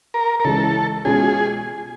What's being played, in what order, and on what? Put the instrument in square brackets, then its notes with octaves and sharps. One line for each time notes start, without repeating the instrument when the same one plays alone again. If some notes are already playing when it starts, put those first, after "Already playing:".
[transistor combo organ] A#4
A#4
[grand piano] C#3 E3 G#3 [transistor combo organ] A4
[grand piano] B2 G#3 C#4 F4 [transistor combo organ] G#4